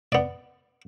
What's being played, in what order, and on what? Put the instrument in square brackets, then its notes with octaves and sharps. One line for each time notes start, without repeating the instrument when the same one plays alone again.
[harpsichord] B3 D5